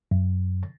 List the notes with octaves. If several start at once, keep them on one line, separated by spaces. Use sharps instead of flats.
F#2